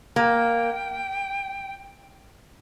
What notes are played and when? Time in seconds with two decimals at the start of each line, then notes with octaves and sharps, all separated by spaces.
0.16 A#3 G5 A#5